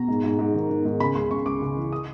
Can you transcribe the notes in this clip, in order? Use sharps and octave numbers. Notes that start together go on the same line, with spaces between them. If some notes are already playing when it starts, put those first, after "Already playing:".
Already playing: B2 A#5
G#2
G#2
G#2
D#3
D#3
G#2
C#3 B5
C#2 C6
C#2 C#6
C#2 D6
C#3
E3
D#6